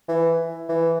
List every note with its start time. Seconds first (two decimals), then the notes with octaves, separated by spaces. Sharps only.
0.08 E3
0.69 E3